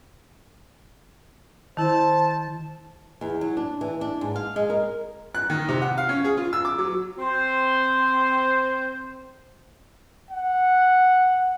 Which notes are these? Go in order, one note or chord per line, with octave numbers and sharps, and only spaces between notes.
D#3 E4 C5 A5
E2
F#3
D4
E3
D4
G#2
F5
G#3
A#4
F#6
D#3
C3
F#5
F5
C#4
G#4
F4
E6
D6
F#3
C4 C5
F#5